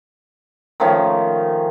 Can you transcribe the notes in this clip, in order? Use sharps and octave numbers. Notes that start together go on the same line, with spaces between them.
D#3 F3 A3 C#4